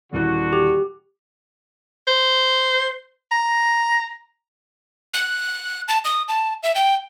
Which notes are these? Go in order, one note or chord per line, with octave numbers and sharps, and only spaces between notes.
D#1 D3 E3 F#4 F#6
G4
C5
A#5
F#6
A5
D#6
A5
E5
G5